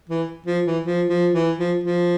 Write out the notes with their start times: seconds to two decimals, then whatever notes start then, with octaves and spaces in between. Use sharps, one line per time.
0.09 E3
0.46 F3
0.66 E3
0.84 F3
1.09 F3
1.33 E3
1.59 F3
1.84 F3